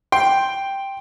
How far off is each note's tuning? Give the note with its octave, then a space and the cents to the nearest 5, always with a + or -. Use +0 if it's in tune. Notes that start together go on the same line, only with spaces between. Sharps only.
G5 +0 C6 +5